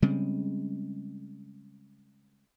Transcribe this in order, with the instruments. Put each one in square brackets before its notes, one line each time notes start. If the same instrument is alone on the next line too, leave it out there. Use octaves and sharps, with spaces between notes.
[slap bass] C#3 G3 G#3 C4